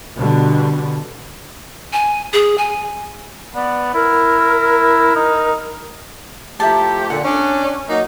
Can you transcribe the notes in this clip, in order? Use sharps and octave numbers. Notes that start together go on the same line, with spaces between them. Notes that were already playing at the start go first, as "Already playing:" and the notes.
B2 D3 G3
G#5
G#4
G#5
B3 D5
E4 A#4
D#4
F3 A3 E4 G4 A#4 A5
A#2 D3 F#5
C#4 D4
F#3 A#3 D#4